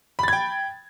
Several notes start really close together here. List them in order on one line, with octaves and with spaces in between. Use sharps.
B5 A6 G#6 G5